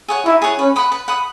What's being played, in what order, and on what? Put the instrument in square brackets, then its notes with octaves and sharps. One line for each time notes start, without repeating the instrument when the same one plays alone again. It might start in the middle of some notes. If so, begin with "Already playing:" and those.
[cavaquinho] G#4 C#5 F#5
[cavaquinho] D#4 [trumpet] E4
[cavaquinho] G#4 C#5 F#5
[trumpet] C#4 [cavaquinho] B4
[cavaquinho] F#5 B5 D#6
B4
F#5 B5 D#6